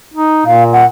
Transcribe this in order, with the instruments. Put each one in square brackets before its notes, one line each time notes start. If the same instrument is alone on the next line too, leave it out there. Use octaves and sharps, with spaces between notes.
[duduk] D#4
[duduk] A#2 [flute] F5
[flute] F#5